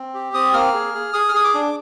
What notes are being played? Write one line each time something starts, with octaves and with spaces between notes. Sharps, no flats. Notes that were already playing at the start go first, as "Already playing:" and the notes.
Already playing: C4
G4
C4 D#6
A#3 F6
G#4
G#4
G#4 D#6
F6
G#4 D#6
D6
D4